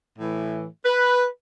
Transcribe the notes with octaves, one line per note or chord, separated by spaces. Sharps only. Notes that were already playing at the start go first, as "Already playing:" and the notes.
A2 E3
B4